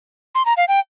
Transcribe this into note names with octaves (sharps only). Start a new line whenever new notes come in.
C6
A#5
F5
G5